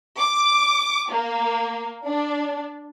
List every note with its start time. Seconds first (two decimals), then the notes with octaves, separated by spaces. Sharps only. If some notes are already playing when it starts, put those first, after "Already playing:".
0.18 D6
1.10 A#3
2.05 D4